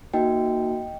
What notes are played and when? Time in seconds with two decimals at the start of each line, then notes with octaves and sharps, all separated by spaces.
0.14 A#3 D#4 F#4 D#5 G5